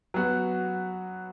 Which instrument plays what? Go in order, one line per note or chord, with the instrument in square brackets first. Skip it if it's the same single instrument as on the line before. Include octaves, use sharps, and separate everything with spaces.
[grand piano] F#3 B3 F#4